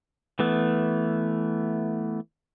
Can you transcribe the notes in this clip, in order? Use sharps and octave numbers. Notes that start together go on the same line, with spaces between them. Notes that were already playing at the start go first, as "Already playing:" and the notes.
E3 A3 B3